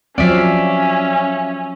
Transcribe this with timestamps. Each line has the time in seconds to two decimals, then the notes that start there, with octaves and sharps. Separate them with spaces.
0.18 F3 F#3 C4 C#4 D5 E5 F5